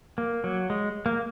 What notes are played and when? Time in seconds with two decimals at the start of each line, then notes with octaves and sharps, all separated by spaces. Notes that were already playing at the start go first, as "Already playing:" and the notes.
0.18 A#3
0.44 F#3
0.70 G#3
1.06 A#3